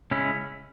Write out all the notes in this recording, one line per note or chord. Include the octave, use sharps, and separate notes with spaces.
C#3 G#3 C#4 E4